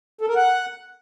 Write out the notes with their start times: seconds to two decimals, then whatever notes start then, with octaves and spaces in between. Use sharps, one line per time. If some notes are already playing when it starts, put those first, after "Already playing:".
0.21 A4
0.28 A#4
0.36 F#5